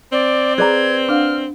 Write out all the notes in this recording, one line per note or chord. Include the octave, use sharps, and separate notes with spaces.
C4 D5
G#4 B4 D5 A#5 G#6
D4 F5 F#5 F6